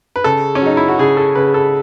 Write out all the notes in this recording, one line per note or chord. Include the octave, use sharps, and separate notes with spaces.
B4
C#3 A4
C#4
F#3 D#4
E4
F#4
C#3 G#4
A4
C#3 B4
A4